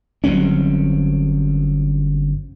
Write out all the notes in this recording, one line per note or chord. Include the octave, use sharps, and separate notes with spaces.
G1 F#3 C4 C#4